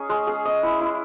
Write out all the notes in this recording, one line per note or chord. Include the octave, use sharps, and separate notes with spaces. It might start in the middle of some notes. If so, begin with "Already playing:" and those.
Already playing: C#4 D#4 G#4
G#3
G#4
D#5
E4
E4